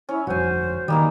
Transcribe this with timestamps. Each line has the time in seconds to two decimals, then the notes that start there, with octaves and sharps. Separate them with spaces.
0.09 C#4 E4
0.27 G1 F2 F#4 C5 G#5
0.88 D#3 G3 A#3 D#4